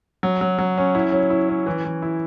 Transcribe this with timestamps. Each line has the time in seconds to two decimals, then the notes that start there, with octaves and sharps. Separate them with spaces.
0.23 F#3
0.41 F#3
0.58 F#3
0.77 C#4
0.95 E4
1.12 F#3
1.30 E4
1.49 C#4
1.66 E3
1.85 E3
2.02 E4